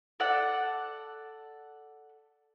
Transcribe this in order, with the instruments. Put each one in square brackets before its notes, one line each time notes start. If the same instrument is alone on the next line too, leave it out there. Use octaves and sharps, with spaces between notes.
[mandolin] A4 D5 F#5